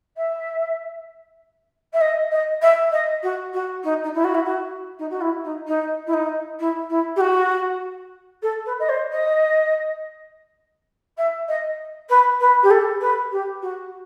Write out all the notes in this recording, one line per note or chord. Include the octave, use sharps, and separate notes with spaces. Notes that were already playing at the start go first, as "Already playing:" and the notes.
E5
E5
D#5
D#5
E5
D#5
F#4
F#4
D#4
D#4
E4
F#4
E4
F#4
D#4
F#4
E4
D#4
D#4
E4
D#4
E4
E4
G4
F#4
A4
B4
D#5
C5
D#5
E5
D#5
B4
B4
G4
A4
B4
G4
F#4